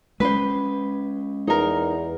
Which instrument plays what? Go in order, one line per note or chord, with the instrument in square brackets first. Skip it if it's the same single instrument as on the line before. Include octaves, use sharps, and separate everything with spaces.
[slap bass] G#3 C#4 [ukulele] B4 C5
[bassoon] E2 [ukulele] D#4 A#4